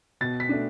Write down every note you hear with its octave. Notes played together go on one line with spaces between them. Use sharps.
B2 A6
B6
A3 D4